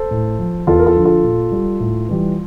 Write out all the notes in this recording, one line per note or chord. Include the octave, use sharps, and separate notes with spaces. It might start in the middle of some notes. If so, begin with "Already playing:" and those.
Already playing: A4 C5
A2
F3
E2 F4 A4
A#4
F4 A4
D3 F3
F4 A4
A#2
G3
A2
E3 G3